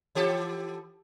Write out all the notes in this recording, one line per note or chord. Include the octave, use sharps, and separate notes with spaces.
E3 G4 A4